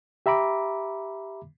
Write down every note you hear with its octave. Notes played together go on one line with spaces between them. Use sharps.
G4 E5 A#5 B5 D6